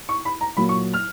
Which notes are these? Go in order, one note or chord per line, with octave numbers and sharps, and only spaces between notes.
C#6
B5
A#5
A#2 F#3 B5
C#6
F6